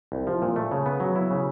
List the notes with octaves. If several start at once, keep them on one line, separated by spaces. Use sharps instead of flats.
C2
F3
A#2
A3
C#3
B3
F#3
E4
C#3